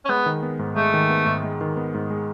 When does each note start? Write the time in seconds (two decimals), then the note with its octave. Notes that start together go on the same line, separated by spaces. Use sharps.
0.05 C#4
0.09 G#3 B3
0.26 D#3
0.43 B3
0.59 G#2
0.76 G#3 A3
0.94 D#3
1.10 B3
1.26 G#2
1.43 G#3
1.61 D#3
1.77 B3
1.94 G#2
2.10 G#3